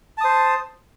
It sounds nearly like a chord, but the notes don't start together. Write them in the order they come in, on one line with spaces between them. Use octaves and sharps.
A5 D#6 C5